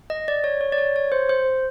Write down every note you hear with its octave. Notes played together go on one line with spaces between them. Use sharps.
D#5
D5
C#5
C#5
D5
C#5
C#5
C5
C5